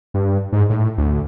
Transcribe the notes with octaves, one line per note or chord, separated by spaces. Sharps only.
G2
G#2
A2
D2